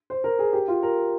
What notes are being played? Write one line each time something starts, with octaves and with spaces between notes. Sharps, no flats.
C5
A#4
G#4
G4
F4
A#4